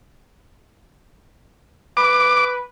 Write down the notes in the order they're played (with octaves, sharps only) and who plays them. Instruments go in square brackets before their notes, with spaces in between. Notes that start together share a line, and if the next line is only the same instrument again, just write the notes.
[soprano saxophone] B4 [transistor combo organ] D6